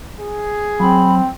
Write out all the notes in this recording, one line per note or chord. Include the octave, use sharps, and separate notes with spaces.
G#4
F#3 C4 B5